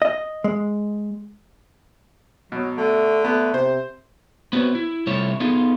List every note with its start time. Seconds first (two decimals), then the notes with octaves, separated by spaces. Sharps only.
0.02 D#5
0.44 G#3
2.52 B2 F#3
2.78 D3 A3
3.25 A3 B3
3.54 C3 C5
4.53 B3 C4 F#4 B4 C#5
4.75 E4
5.07 C3 G3 A3 E4 F4 C#5
5.40 B3 D#4 F4 G#4 A4